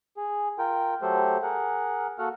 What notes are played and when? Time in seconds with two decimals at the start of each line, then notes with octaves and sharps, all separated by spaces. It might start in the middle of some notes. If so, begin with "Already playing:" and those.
0.17 G#4
0.59 F4 A#4 G5
1.02 F#3 A3 G4 A4 C5
1.42 G#4 A#4 F#5
2.19 A#3 F#4 A4 F#5 F6